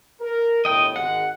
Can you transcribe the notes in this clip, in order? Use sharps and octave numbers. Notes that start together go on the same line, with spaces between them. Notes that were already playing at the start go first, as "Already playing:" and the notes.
A#4
G1 A2 D#5 G5
G#1 G#3 F#5